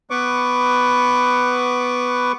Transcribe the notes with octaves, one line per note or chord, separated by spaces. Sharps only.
B3 B4 C#6 D6